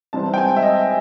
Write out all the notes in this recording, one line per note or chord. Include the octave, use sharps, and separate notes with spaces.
C2 C3 E3 G3 C4 A5
G5
G#5
E5
D#5